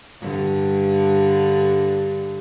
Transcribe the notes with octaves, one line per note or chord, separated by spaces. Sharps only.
G2 D3